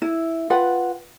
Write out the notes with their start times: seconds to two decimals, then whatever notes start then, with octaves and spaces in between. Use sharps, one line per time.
0.02 E4
0.50 F4 B4 F#5 G5